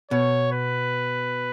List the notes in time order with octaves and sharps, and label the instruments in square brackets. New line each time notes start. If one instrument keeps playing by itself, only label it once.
[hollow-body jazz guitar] B2 [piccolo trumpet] C#5
[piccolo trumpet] B4